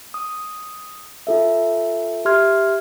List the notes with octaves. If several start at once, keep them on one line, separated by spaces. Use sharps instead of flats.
D#6
F4 A4 E5
G4 E5 C6 F6 G#6